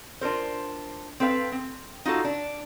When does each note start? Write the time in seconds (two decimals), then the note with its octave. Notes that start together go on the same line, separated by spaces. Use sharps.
0.21 D4 F4 A#4 C5
1.20 C4 A4 B4 F5
1.52 C4
2.05 D#4 F4 F#4 A4
2.24 D4